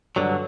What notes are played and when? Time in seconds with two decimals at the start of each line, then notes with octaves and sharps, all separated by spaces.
0.16 G2 D3 F#3